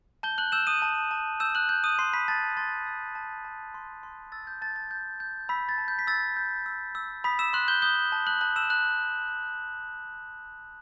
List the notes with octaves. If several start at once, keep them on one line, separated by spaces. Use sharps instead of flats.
A5 G6 G7
F#6 F#7
E6 G6 E7
D#6 D#7
A5
A5
E6 G6 E7
F#6 F#7
G6
D#6 D#7
C6 D#6 C7
B5 B6
A5 A6
C6 A6
E6
A5
A5
C6
C6
E6 A6
G6
A5 A6
A6
G6
G6
B5 E6 B6
A6
A5
G6
B6
E6 A6
G6
E6
E6
B5 D#6 B6
E6 E7
C6 F#6 F#7
G6 G7
D#6 G6 G7
A5
F#6 F#7
A5 F#6 F#7
E6 E7
A5 F#6 F#7